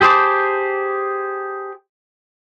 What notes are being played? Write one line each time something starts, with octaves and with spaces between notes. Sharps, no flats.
G4 G#4 C5 A5 D6